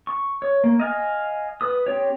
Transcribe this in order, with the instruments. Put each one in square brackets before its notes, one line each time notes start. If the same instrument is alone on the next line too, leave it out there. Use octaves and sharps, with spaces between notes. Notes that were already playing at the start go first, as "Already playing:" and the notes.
[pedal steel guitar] C#6
C#5
A#3
D#5 F5 G#5
B4 D#6
C4 G4 C#5